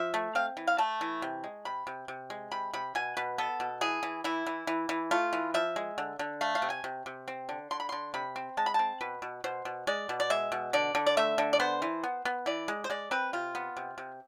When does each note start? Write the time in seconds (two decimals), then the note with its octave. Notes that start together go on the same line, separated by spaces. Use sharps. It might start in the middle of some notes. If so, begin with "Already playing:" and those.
Already playing: F3 E5
0.14 A3
0.35 C4 F5
0.57 E3
0.67 F5
0.78 A3 A5
1.01 E3
1.22 C3
1.44 G#3
1.65 C3 B5
1.87 C3
2.08 C3
2.30 G#3
2.52 C3 B5
2.74 C3 B5
2.95 B2 G#5
3.17 B2 B4
3.38 B3 A4
3.60 B2
3.81 E3 G#4
4.03 E3
4.24 E3 E4
4.47 E3
4.67 E3
4.89 E3
5.11 A3 F4
5.33 E3
5.54 F3 E5
5.76 G#3
5.98 D3
6.19 D3
6.41 A3 F5
6.55 F5
6.62 C3
6.70 G#5
6.84 C3
7.06 C3
7.28 C4
7.49 D3
7.71 D3 C6
7.80 B5
7.89 D3 C6
8.14 C3 B5
8.36 C4
8.57 G#3 A5
8.66 B5
8.74 C4 A5
9.01 B2 B4
9.22 B2
9.44 B2 C5
9.65 B2
9.87 G#3 D5
10.09 B2
10.20 D5
10.30 G#3 E5
10.52 B2
10.73 D3 D5
10.95 D3
11.06 D5
11.17 A3 E5
11.38 D3
11.53 D5
11.60 B3 C5
11.82 E3
12.04 B3
12.25 B3
12.46 E3 D5
12.68 G#3
12.84 C5
12.90 G#3 D5
13.11 C4 B4
13.33 C3 F4
13.55 B3
13.77 C3
13.98 C3